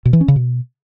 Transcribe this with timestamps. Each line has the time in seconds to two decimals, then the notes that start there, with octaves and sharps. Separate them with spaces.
0.05 B2
0.13 E3
0.21 C#4
0.28 C#3
0.36 B2